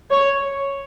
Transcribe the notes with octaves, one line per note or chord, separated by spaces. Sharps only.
C#5